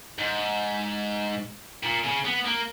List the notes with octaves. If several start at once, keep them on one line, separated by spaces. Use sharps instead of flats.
G#2
A#2
C#3
B3
A#3